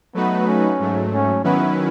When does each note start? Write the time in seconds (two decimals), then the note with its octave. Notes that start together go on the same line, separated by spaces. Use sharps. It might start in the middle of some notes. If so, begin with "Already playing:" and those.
0.14 F#3 A3 B3 D#4 F#4 B4
0.47 C#4
0.79 G#2 F#3 A3
1.12 C#4
1.44 D#3 F#3 B3 C#4 E4 B4